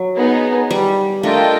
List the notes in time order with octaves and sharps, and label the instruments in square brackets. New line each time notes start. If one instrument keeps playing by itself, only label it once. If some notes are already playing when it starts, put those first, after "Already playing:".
Already playing: [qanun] F#3
[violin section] B3 D#4 G#4
[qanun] G3
[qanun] A3 [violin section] D4 F4 A#4 D#5 G5